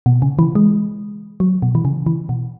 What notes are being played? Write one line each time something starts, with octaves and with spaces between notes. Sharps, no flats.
B2
C#3
E3
G#3
F#3
B2
E3
C#3
E3
B2